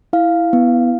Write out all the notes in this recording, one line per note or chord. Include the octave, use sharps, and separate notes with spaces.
E4 F5
B3